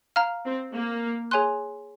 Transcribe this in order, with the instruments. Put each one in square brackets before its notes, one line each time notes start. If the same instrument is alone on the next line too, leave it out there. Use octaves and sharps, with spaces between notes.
[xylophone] F5 A#5 F6
[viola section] C4
A#3
[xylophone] G#4 C#5 G#5 C6 F#6